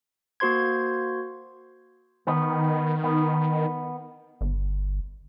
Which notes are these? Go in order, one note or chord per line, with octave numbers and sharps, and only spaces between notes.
A#3 F#4 C5 C6 G#6
D#3 B3
B3
G1